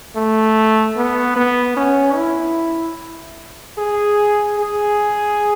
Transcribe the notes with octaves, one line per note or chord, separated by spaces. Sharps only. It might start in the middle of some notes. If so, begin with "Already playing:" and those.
A3
B3
B3
C#4
E4
G#4
G#4